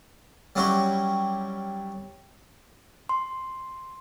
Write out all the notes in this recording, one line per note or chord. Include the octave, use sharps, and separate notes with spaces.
F#3 G3 C#4 E4 F#4 G4
C6